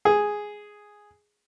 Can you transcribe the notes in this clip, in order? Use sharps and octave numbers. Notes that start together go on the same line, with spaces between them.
G#4